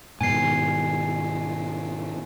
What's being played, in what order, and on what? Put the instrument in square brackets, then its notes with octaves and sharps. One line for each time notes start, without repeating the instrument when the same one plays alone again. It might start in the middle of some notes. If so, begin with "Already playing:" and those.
[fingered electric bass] G#2 B2 D#3 [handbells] G#5 C7